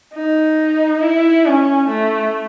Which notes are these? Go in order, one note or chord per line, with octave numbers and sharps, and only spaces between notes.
D#4
E4
C#4
A3